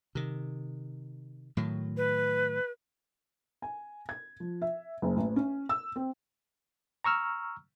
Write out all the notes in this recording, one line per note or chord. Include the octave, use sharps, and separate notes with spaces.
C3 D#3
A2 D#3 F#3
B4
G#5
G#6
F3
E5
F#1
A1
C#4
E6
C4
A#5 C#6 E6 F6